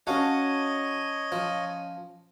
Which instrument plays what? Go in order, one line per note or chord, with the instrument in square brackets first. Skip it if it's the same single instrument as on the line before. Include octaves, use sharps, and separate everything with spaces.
[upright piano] C#4 A5 [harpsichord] F#4 F5 [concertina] C#5 D#5
[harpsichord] F3